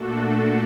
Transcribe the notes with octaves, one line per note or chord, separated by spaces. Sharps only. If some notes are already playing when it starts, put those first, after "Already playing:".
Already playing: A#2 A3 D4 F#4 A4